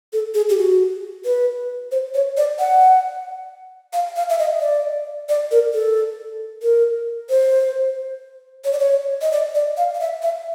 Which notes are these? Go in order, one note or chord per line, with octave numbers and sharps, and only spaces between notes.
A4
G#4
G4
F#4
B4
C5
C#5
D5
F#5
F5
F5
E5
D#5
D5
D5
A#4
A4
A#4
C5
C#5
D5
C#5
D#5
D5
D5
F5
F5
E5
E5